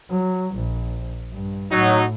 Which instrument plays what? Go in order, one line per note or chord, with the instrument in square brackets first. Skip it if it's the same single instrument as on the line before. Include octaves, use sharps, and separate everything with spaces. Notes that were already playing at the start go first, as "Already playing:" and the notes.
[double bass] F#3
A#1
G2
[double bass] A2 [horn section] F#3 D#4